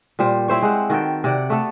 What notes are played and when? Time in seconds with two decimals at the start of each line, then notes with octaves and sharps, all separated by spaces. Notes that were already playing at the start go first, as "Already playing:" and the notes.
0.19 A#2 G3 C5
0.48 C4 E4 C5 C#5
0.62 G#3 F#5
0.90 D#3 F#4 A4 G5
1.24 C3 D5 F#5
1.50 A3 B3 A4